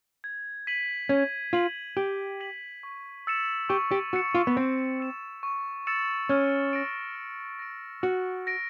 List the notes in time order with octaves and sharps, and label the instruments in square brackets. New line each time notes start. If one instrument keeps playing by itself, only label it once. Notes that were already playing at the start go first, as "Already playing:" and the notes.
[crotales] G#6
B6 D#7 F#7
[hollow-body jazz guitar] C#4 [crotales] G#6
[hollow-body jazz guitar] F4 [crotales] B6 D#7 F#7
[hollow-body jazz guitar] G4 [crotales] G#6
[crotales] B6 D#7 F#7
C#6
E6 A6 C#7 E7
[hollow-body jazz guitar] G4 [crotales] C#6
[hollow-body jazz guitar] G4
[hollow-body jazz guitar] F#4 [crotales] E6 A6 C#7 E7
[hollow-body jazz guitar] F4
B3
[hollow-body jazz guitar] C4 [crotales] C#6
[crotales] E6 A6 C#7 E7
C#6
E6 A6 C#7 E7
[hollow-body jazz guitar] C#4 [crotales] F6
[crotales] A#6 D7
F6
A#6 D7
[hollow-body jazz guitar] F#4 [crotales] F6
[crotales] A#6 D7